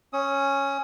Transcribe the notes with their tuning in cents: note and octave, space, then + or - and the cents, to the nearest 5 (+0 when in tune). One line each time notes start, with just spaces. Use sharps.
C#4 -5 D#6 +30